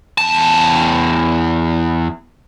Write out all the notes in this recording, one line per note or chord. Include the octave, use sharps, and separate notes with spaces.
E2 A5